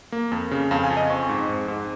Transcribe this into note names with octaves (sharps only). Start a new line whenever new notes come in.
A#3
F2
C#3
F2 F5
G#5
F2
D#5
C4 C#6
G#2
G#2
G#2